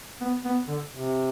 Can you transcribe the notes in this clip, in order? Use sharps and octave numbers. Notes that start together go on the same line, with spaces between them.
B3
B3
D3
C3